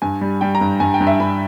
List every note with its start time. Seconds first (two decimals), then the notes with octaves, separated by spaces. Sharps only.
0.02 G2 G#5
0.21 G3
0.41 G3 G5
0.55 A#5
0.61 G2
0.80 G2 G#5
0.94 G5
1.01 G2
1.07 E5
1.20 G2 B5